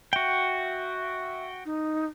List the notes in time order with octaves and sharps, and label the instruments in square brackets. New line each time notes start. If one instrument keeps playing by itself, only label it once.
[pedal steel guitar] F#4 G5 [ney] E5
[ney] D#4